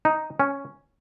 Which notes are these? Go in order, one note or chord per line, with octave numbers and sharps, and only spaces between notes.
D#4
C#4